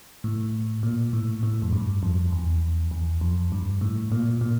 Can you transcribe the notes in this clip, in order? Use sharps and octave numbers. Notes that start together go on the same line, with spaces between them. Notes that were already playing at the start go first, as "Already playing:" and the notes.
A2
A#2
A2
A2
F2
G2
F2
E2
E2
F2
G2
A2
A#2
A#2